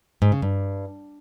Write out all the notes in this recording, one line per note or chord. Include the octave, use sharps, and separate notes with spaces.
G#2
C#3
G2